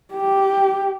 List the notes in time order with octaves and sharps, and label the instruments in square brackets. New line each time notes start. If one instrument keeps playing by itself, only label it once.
[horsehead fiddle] G4